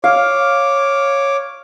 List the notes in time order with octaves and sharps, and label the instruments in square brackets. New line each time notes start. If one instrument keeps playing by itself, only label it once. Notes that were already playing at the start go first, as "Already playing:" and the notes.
[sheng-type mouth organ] C#5 D6 [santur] F5